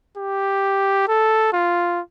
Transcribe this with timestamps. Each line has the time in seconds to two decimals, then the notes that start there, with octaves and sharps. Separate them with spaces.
0.17 G4
1.08 A4
1.53 F4